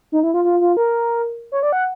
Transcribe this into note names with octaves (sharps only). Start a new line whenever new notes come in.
D#4
E4
F4
F4
F4
A#4
C#5
D5
F#5